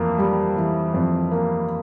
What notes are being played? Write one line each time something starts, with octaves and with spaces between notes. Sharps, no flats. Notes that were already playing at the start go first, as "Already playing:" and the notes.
Already playing: F2 E3 A#3
G3
E3
F2
A#3